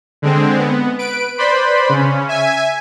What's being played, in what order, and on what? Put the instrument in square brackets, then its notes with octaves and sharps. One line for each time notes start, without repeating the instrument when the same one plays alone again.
[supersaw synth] D3 G#3 C4
B3
B4 D7
B4 C5 D5 B5 C6
C#3 C#4
E5 G#5